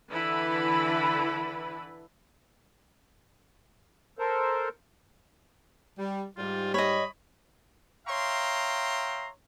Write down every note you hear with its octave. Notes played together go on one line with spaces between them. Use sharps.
D3 E3 E4 A4 B4 B5
A4 A#4 C5
G3
G#2 G3 F4
C#5 D#5 B5
C#5 E5 F5 G5 A#5 C6